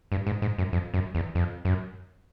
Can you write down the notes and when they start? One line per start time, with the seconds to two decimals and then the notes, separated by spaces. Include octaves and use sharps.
0.12 G2
0.27 G#2
0.42 G#2
0.58 F#2
0.73 F2
0.94 F#2
1.15 E2
1.35 F2
1.65 F#2